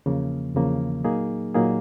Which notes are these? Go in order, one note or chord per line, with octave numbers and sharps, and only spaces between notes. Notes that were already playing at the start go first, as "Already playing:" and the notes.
E2 C#3 F3 A#3
E2 C#3 F3 A#3
A#2 F#3 A#3 D#4 G#4
A#2 F#3 A#3 D#4 G#4